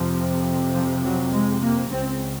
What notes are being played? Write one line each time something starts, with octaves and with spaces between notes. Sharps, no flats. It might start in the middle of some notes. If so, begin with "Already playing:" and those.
Already playing: F2 C3 F3
F3
F#3
G#3
A#3
C#2 C#3 C4